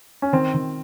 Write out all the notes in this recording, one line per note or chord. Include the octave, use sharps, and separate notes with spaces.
C#4
D#3 C4
D#3